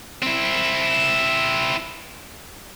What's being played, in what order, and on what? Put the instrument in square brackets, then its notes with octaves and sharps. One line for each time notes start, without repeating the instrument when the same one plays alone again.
[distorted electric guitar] C4 E4